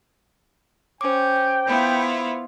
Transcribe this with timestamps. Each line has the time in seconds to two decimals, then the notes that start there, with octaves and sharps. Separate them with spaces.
1.01 C#4 C5 G5 D6
1.66 B3 E4 F4